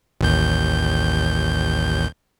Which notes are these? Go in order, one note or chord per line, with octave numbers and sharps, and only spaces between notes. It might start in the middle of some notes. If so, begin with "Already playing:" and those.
A1 D#2 G6